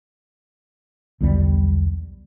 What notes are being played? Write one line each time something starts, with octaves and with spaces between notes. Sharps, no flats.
B1 E2 D3 G3